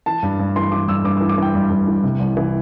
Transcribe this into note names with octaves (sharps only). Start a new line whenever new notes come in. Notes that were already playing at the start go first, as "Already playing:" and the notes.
E3 A5
G2
G2
E3 C6
E3 D6
G2 E6
G2 D6
E3 E6
D6
E3 G5
G2
G2
E3
C3
C2
E3